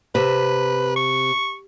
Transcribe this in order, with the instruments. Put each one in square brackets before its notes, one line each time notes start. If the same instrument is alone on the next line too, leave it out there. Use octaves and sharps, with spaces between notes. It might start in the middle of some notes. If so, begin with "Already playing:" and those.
[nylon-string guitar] C3 [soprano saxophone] B4
[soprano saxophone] C#6